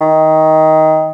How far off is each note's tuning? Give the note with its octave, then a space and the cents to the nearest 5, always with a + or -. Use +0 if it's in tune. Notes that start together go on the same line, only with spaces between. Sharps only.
D#3 +15